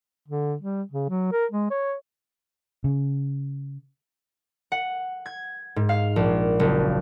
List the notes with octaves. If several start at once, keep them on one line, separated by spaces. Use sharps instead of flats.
D3
G3
C#3
F#3
A#4
G#3
C#5
C#3
F#5
G#6
G#2
F5
A#1
F#1